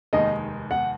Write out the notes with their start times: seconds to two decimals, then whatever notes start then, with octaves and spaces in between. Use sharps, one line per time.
0.13 F1 D#2 D#3 G#3 D#4 D#5
0.71 F#5